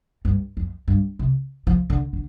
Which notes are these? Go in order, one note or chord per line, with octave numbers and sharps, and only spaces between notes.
G2
F2
G2
C3
F3
D3
D3